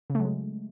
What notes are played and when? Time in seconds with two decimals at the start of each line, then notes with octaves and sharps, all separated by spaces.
0.10 C#3
0.15 A3
0.20 F#3
0.25 G#3